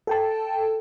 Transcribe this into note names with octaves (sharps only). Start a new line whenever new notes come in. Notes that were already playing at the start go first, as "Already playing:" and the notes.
A4 G5 A5